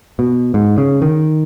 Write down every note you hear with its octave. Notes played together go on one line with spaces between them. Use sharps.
B2
G#2
C#3
D#3